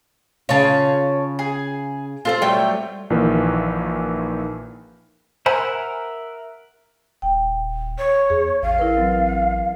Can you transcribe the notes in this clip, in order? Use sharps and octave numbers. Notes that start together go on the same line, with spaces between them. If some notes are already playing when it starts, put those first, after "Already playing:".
C#3 F4 C#5 A5
G#4
C4 F4 A4 C5
F#3 G3 A3 C#5 G5
A#1 A#2 D#3 E3 A#3 B4
A#4 C5 E5 F#5 G#5 B5
D#1 G5
C#5
E2 G#4
A1 F5
E4 A#4 B4
F#3 C4 A6